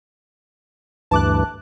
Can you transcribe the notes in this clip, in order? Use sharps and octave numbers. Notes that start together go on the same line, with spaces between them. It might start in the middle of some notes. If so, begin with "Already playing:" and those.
D2 G2 E3 A5 D6 F#6